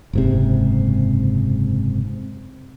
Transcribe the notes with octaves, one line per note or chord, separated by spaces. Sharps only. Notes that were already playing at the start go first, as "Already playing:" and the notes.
F#1 G#2 C3